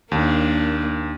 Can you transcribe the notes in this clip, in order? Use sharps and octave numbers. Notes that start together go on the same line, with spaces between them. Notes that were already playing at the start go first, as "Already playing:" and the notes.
D#2 A#3 D4